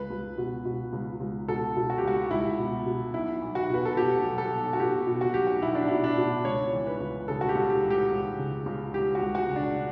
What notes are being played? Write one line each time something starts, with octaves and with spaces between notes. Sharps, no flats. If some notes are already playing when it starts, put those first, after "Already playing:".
Already playing: C#2 B4
C#2
B2
B2
C#2
C#2
B2 A4
B2
F#4
G4
C#2 F#4
F#4
C#2 E4
B2
B2
B1 E4
B1
F#4
B2 B4
A4
B2 G4
B1
A4
B1
F#4
B2 G4
B2
F#4
B1 G4
F#4
B1 E4
D4
B2 E4
D4
B2
C#2 C#5
E3
B4
C#2
C#3 A4
F#4
G4
C#2
G4
E3
G4
C#2
C#3
C#2
E3 G4
F#4
C#2
F#4
C#3
D4